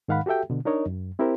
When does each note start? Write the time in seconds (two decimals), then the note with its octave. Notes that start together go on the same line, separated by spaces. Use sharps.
0.08 G#2 D#3 F5 F#5 B5
0.26 F#4 G4 A4 E5 G5
0.50 B2 D3
0.65 D4 D#4 A#4 C#5 D#5
0.86 F#2
1.19 C4 E4 G4 A#4 C5